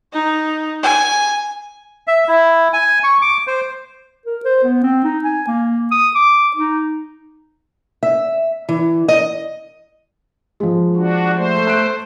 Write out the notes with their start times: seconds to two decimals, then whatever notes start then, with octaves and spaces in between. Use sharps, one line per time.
0.13 D#4
0.83 G#5
2.07 E5
2.28 E4
2.73 G#5
3.03 C#6
3.22 D6
3.47 C5
4.26 A#4
4.45 C5
4.63 B3
4.83 C4
5.04 D#4
5.24 G#5
5.48 A#3
5.92 D#6
6.15 D6
6.56 D#4
8.03 E5
8.69 E3
9.08 D#5
10.60 F3 G#3
10.96 D4 F#4
11.35 A3 C5
11.67 F#6 D7